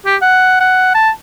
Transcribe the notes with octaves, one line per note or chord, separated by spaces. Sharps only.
G4
F#5
F#5
A5